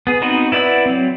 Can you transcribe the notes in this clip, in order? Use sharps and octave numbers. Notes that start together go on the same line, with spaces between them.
B3 G#4
B3 C4 D#4 F#4 B4
E4 B4 D5 F#5 E6
F#3 C4